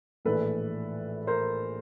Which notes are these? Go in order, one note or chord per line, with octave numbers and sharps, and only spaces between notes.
A#1 A2 E3 A4 B4
A#4 C5